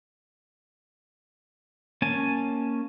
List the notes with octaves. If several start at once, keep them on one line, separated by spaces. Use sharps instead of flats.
A#3 C#4 G#5 A5